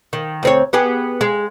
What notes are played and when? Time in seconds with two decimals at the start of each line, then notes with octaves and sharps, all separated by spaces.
0.13 D#3
0.43 D2 C4 C#5
0.73 B3 G4 G#4
1.21 G#3